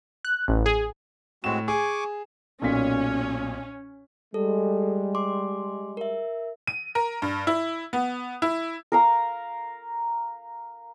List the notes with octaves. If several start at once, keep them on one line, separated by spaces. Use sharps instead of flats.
F#6
A1
G#4
A2 G#3 C4 F#4 E7
G#4 G#5 C#6 D6
B1 A#2 C#4 B6
G3 G#3 A4
C6 D6
A#4 E5
D#7
A#4
G2
E4
B3
E4
A#4 F5 A#5